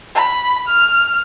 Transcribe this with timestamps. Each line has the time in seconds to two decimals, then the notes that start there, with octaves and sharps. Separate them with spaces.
0.15 B5
0.68 F6